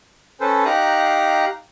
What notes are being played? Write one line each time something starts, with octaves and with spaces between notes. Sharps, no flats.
C#4 A4 B4 C5
D#4 G4 F5 A#5 F#6